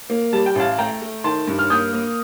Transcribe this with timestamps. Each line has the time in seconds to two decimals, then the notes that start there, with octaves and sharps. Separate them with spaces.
0.10 A#3
0.33 G3 A5
0.46 G5
0.55 A1 F5 A5
0.78 A3 G5 A#5
1.02 A3
1.24 D#3 A5 C6
1.47 G2
1.59 F6
1.70 A#3 D#6 G6
1.93 A#3